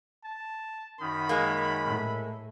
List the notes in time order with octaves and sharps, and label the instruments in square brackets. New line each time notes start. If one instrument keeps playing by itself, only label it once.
[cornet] A5
[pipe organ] F#2 D#3 D#4 [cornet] B5
[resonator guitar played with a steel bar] G#3 A#3
[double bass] A2